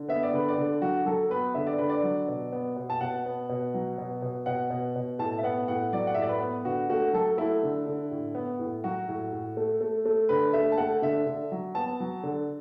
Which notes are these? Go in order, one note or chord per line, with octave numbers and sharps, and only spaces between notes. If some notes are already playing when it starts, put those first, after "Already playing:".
Already playing: D3
B3 E5
D5
D3 B4
D5
D3
F#3 F#4
F#3 A4
B3 B4
D3 E5
D5
D3 B4
D5
F#3
B2
B3
B2
A5
B2 F#5
B3
B2
F#3
B2
B2
B2 F#5
B2
B2
A2 A5
E5
B3 F#5
A2 F#5
F#3 D5
F#5
A2 E5
D5
B4
B3
D3 F#4
A3 F#4
F#3 A4
A3 E4
D3
D3
A2
B3
A2
F#3 F#4
A2
A2
A3
A3
A3
D3 B4
A3 E5
A5
A3 F#5
D3 E5
D3
F#3
B3 A5
F#3
D3